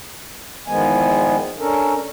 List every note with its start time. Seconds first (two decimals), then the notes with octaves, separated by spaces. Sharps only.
0.68 E2 D#3 F3 G#3 B3 G#5
1.59 C#4 D4 A4 A#4